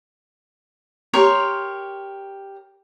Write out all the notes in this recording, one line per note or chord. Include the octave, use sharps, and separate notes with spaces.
G4 A#4 C#5 C6